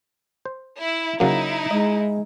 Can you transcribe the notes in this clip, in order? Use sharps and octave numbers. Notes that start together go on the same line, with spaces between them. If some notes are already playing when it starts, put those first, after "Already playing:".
C5
E4
C#3 F#3 A#3 D#4 E4
G#3 D#5